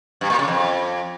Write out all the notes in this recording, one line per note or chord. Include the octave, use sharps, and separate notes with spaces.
G2
A#2
C#3
F2